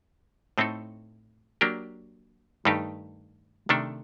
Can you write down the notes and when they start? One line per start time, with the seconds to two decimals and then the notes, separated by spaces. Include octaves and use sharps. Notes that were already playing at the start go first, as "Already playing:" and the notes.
0.58 A2 A3 C4 D#4 A4
1.61 F#3 A#3 D4 G4 A#4
2.65 G2 D#3 A3 D#4 G4
3.69 C3 D#3 A3 D4 A4